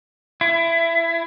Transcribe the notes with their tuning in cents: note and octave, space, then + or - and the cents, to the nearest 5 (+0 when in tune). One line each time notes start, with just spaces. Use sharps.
E4 +20